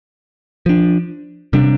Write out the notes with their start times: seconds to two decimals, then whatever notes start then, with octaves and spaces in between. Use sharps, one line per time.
0.66 F3 D4
1.53 C3 G3 D4